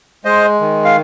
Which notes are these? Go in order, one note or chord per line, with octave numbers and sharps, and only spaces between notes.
G#3 C5 D#5
D#3
F5